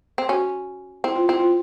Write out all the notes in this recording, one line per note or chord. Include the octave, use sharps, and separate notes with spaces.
C4
C#4 F#4
C4 E4
F4
C4 E4
F4